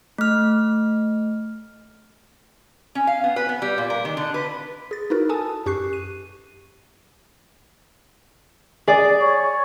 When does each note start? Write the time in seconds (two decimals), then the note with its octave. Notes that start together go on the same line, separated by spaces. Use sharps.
0.18 A3 F6
2.95 C#4
3.07 F5
3.24 B3
3.36 B4
3.49 B3
3.62 G3
3.78 A#2
3.90 A#4
4.05 D#3
4.17 D3
4.34 B4
4.91 G#4 A6
5.10 D#4 E4 F#4 A#4 B4
5.29 A4 G#5 A5 D#6
5.66 F#2 G4 C#6 F#6 C7
5.93 D#7
8.87 G#4 D5
9.21 C#5